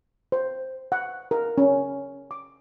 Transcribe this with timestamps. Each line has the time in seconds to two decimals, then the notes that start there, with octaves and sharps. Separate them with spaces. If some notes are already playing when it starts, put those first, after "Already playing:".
0.32 C5
0.92 F#5
1.31 A#4
1.58 C#4
2.31 D6